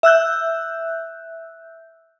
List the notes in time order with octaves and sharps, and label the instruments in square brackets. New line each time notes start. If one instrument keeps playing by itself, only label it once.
[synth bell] E5 E6 F#6 G6